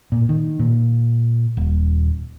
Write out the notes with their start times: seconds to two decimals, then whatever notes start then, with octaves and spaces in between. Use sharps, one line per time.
0.12 A#2
0.29 D#3
0.59 A#2
1.57 D#1